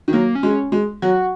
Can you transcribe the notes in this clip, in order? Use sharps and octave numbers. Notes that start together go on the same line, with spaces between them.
D#3
F#3 A#3
C#4
G#3
G#3
F#3 F#4